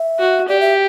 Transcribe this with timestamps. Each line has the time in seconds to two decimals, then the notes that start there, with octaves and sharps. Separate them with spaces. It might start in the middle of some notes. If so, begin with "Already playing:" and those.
Already playing: E5
0.19 F#4
0.48 G4 D5
0.60 E5